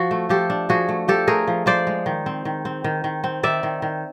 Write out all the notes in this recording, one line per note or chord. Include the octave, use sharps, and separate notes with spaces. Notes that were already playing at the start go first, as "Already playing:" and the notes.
Already playing: F3 F#4
A3
F3 G4 A4
D4
F3 F#4 G#4
A3
F3 G4 A4
A3 G#4 A#4
F3
F3 C5 D5
G#3
D#3
C4
D#3
C4
D#3
D#3
C4
D#3 D5 E5
D#3
D#3